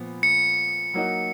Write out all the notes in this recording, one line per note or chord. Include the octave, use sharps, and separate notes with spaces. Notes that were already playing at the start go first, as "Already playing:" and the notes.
Already playing: A#2 F3 B3
C#7
F#3 A#3 D#4 F#4